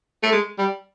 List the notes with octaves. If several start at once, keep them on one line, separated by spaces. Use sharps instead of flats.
A3
G#3
G3